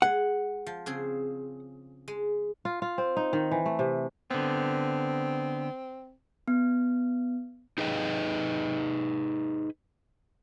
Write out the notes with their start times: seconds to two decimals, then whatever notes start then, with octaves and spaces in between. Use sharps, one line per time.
0.02 G#3 F#5
0.67 F3
0.86 C#3 C4 G#4
2.08 G#3
2.65 F4
2.82 F4
2.98 C4
3.17 D#4
3.33 D#3
3.51 E3
3.66 A3
3.79 C3
4.31 D3 B3 C4
6.48 B3
7.78 D#4 G#4 B4 D#5 F#5 G5